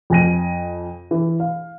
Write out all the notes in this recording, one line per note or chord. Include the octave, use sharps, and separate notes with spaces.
F2 G#5 A#6 D#7
E3
F5